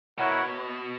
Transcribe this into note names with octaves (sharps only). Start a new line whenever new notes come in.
B2 E4 A#4 C#5 F#5